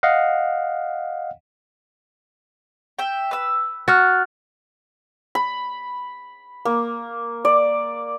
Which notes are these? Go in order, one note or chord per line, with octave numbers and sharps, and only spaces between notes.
D#5 F5 F#5
E5 G5
B4 E6
F#4 F6 F#6 A6
B5
A#3
D5